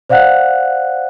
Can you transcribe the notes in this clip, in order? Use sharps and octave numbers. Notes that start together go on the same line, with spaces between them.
C5 D5 F5 F#5 F#6